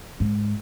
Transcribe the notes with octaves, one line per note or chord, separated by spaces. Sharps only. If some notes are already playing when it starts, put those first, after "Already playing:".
G#2